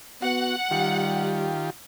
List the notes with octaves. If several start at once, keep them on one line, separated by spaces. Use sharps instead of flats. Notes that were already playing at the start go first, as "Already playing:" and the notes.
B3 F#4 F#5
D#3 G3 F4 G4